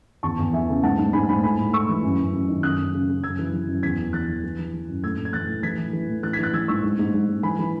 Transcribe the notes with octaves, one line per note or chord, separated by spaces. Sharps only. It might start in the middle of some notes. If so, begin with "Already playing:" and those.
E2 A5 C#6
E2
E3 E5 G#5
C#3
G#2 F#5 A5
G#2
G#2 G#5 B5
G#2 G#5 B5
A2 G#5 B5
A2
A2 C#6 E6
E3
F#2
F#2
F#2
D#3
F#2 D#6 F#6
F#2
C#3
C#3
F#2 E6 G#6
E3
E3
F#2
E2 G#6 B6
E3
E3 F#6 A6
E3
E3
E3
E3
F#2
A2 E6 G#6
A2
G#6
E3 F#6 A6
A2
E3 G#6 B6
E3
E3
A2
E3 F#6 A6
G#6 B6
E3 F#6 A6
E3 E6 G#6
G#2 C#6 E6
G#2
G#2
G#2
G#2
E3 G#5 B5
E3